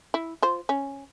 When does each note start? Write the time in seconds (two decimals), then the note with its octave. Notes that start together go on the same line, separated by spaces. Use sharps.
0.14 E4
0.42 F4 C5
0.69 C#4